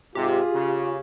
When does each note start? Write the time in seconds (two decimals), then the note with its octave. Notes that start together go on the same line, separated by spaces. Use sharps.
0.15 G#2 C3 F4 G4 G#4
0.53 C#3